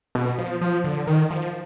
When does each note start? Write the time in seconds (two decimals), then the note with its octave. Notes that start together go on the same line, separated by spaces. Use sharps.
0.15 B2
0.38 F3
0.61 F3
0.84 D3
1.07 D#3
1.30 F3